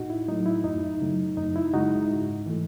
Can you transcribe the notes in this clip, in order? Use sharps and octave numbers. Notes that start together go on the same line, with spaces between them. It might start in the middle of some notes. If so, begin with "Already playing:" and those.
Already playing: A2 D#4 F#4
E4
F#3 A3 D#4
E4
F#2 D#4
C#3 F#3 A3
F#2 D#4
E4
C#3 G#3 D#4 F#4
G#2
E3 A3